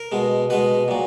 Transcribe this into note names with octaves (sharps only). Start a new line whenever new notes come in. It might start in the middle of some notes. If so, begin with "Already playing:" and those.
Already playing: A#4
B2 G#3
B2 G#3 B4
A#2 F#3